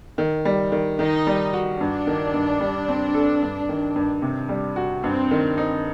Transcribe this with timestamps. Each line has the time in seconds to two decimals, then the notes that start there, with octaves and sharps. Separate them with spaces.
0.18 D#3
0.45 G3
0.72 D#3
0.99 D#3 D#4
1.27 G3
1.53 F#4
1.80 G2 D4
2.07 D#3
2.34 G2
2.60 G3
2.88 C4
3.14 A4
3.42 G2
3.69 D#3
3.96 G2
4.22 C3
4.49 G3
4.76 F#4
5.04 G2 C4
5.31 D#3
5.57 D#4